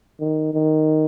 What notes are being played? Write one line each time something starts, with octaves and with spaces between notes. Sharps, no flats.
D#3
D#3